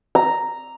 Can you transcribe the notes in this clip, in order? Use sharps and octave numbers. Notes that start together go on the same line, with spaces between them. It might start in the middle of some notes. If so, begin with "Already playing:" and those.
A#5